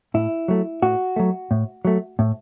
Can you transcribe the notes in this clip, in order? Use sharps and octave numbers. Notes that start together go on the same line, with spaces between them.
A2 E4
F#3 A3
A2 F#4
F#3 A3
A2
F#3 A3
A2